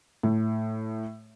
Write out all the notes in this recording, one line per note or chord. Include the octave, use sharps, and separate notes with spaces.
A2